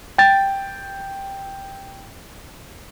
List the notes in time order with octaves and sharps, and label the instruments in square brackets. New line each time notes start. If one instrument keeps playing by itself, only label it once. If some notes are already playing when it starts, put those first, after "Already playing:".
[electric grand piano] G5 A6